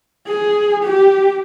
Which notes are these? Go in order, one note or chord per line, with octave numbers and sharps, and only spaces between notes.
G#4
G4